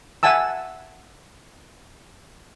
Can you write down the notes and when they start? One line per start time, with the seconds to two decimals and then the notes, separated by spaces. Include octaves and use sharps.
0.23 E5 F#5 G#5 A5 E6